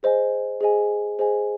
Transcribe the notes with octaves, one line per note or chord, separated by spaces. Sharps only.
G#4 C5 D#5 G#5
G#4 C5 D#5 G#5
G#4 C5 D#5 G#5